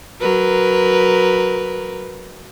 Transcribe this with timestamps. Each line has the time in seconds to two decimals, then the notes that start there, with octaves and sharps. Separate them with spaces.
0.21 F#3 A#4 B4